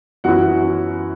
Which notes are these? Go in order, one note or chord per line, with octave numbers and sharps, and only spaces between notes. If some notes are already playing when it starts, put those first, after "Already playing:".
F#2 E3 B3 E4 F#4 F#5